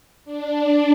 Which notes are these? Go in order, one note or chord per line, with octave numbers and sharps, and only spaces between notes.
D4